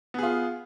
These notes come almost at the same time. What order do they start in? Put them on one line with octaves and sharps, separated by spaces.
B3 G#4 F4